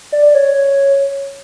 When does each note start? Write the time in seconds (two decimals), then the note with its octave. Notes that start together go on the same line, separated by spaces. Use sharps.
0.12 D5
0.34 C#5